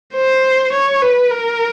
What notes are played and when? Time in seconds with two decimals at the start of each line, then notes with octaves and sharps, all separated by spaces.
0.15 C5
0.72 C#5
1.02 B4
1.31 A#4